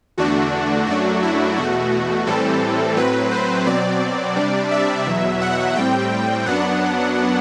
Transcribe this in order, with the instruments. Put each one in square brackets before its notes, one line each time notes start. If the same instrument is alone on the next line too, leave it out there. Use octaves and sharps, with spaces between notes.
[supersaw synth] E2 D3 A3 D4 F#4
F#2 F#3 A3 D4 F#4
E4
E2 B2 A3 F#4
A2 E3 G3 C4 A4
A2 F#3 C4 B4
C5
B2 F#3 C4 D5
C3 G3 D4
E5
E2 B2 F#3
F#5
A2 G3 C4 G5
F#2 F#3 B3 D4 F#5